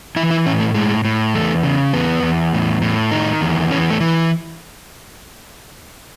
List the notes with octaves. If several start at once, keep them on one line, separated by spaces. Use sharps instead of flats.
E3 E4
E4
A2 C#4
A3
A2 G#3
A2
E2 A3
C#3
E2 B3
E2
A2
A2
D#3 D#4
E2
E3 C#4
A3
E3